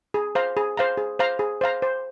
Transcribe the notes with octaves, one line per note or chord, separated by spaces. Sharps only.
G#4
C5 F5 A#5
G#4
C5 F5 A#5
G#4
C5 F5 A#5
G#4
C5 F5 A#5
C5